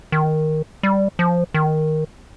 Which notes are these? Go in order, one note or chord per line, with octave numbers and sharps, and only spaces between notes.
D#3
G3
F3
D#3